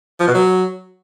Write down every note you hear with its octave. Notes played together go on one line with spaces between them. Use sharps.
F3
B2
F#3